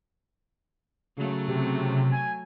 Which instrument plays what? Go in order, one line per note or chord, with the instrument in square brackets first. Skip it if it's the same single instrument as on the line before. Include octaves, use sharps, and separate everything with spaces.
[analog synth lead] C#3 [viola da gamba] F#3 A3
[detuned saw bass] C3
[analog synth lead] G#5